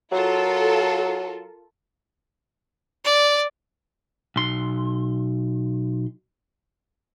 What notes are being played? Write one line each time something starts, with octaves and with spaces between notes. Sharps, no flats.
F#3 F4 A4 A#4
D5
B1 C6